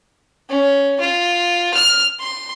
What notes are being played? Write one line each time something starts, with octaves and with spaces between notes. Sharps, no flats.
C#4
F4
F6
C6